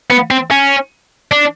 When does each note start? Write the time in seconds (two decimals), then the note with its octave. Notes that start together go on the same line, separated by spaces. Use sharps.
0.10 B3
0.30 C4
0.51 C#4
1.32 D4